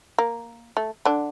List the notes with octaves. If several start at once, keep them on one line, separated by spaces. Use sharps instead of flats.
A#3
A3
D3 D4